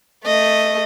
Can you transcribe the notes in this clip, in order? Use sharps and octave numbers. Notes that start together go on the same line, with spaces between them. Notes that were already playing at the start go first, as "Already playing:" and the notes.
A3 D#5